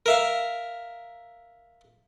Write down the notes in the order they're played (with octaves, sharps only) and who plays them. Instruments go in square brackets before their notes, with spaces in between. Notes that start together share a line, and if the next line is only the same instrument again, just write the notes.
[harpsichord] A#4 E5 F5